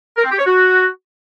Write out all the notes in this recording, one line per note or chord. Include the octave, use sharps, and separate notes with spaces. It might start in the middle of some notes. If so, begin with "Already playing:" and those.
A#4
C4
G4
C#5
F#4